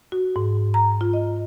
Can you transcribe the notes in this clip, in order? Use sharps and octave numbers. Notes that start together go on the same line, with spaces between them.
F#4
G#2
A#5
F4
D#5